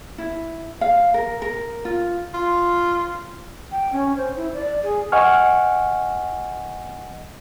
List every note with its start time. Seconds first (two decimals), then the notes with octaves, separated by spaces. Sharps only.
0.18 E4
0.81 F5
1.14 A#4
1.42 A#4
1.85 F4
2.34 F4
3.71 G5
3.92 C#4
4.16 C5
4.36 E4
4.53 D5
4.83 G#4
5.12 D#5 F#5 G#5 C#6 F6